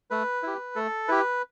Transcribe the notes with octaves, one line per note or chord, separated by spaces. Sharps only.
A3 B4
E4 G4
A3 A4
E4 G4 B4